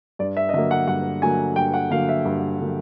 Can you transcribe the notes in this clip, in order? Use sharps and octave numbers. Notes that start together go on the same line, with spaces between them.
G2 D5
E5
D#5
D3 F#3 A#3 E5
F#5
G2 F#5
D3 F#3 A#3 G#5
G2 G5
F#5
D3 F#3 A#3 F5
E5
G2
D3 F#3 A#3